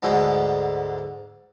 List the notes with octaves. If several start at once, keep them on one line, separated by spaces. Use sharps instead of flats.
D2 G#2 D3 G#3 B3